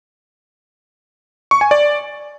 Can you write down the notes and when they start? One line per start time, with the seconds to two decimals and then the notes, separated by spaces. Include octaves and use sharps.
1.51 C#6
1.61 G#5
1.71 D5